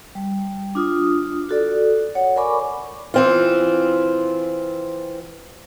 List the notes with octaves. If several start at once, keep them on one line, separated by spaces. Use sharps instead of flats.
G3
D4 F4 D#6
F#4 A4 D5
C#5 F#5
A#4 D5 G#5 B5 C#6 D6
E3 C4 F4